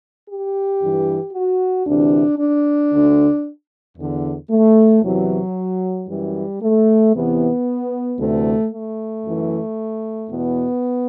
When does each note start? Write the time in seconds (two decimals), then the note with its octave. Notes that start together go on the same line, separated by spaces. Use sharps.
0.28 G4
0.82 G2 E3
1.33 F#4
1.86 D2 C3 E3 D4
2.39 D4
2.92 D2 D3
3.97 E2 D3
4.50 A3
5.02 E2 C3 E3 F#3
6.08 F#2 E3 G3
6.62 A3
7.14 E2 C3 E3 B3
8.19 D2 C3 E3 A3
8.72 A3
9.24 F#2 E3
10.30 E2 B2 B3